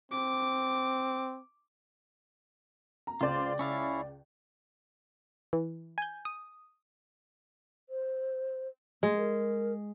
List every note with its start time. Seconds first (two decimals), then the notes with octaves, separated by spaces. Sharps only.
0.12 C4 D6
3.07 A#5
3.21 C#2 F4 C5 D5
3.59 C#4 E4 F5
5.53 E3
5.98 G#5 G6
6.25 D#6
7.89 C5
9.03 G#3 A3
9.17 A#4